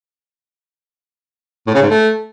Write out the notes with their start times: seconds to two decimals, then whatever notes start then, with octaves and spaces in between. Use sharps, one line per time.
1.67 A2
1.74 C#3
1.82 G#2
1.90 A3